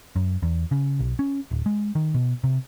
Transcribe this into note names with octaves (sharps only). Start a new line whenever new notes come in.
F#2
E2
C#3
B1
C#4
D1
G#3
D#3
B2
C3